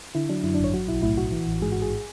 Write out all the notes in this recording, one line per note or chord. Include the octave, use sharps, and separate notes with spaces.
D3 E4
F#3 D4
F#2 E4
G#1 D4
C#5
F#3 F#4
B1 E4
A2 E4
B1 F#4
E3
A1
G#2 G#4
A1 F#4
G#4